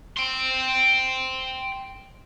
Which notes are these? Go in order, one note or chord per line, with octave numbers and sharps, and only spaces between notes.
G5 C6